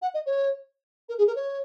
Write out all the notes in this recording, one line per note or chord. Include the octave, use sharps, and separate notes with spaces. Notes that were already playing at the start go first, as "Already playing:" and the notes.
F#5
D#5
C#5
A#4
G#4
A#4
C#5